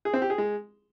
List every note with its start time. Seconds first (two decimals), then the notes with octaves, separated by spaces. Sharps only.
0.05 G#4
0.14 C4
0.22 G4
0.30 G#4
0.38 G#3